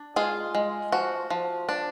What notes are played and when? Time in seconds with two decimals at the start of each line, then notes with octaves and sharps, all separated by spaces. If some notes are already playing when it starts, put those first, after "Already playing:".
Already playing: D4
0.16 G#3 F4 G#4
0.55 G#3
0.92 F3 F#4
1.30 F3
1.69 D4